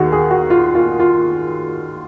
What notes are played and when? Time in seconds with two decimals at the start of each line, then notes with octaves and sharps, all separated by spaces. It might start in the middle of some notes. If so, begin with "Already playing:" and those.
Already playing: D#2 D#3 F#4 G#4
0.12 G#4
0.31 F#4
0.50 F4
0.75 F4
0.99 F4